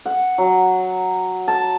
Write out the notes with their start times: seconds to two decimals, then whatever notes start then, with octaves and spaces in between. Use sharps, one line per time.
0.06 F#5
0.38 F#3
1.48 A5